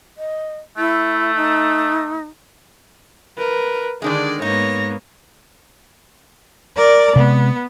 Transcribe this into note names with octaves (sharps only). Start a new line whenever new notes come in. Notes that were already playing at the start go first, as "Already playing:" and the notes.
D#5
A3 E4
D#4
A#4 B4
D3 D#3 G#3 D4 G#4 D5
G#2 A#3 B3 D#4 C#5 A#6
A#4 D5
C3 G#3 B3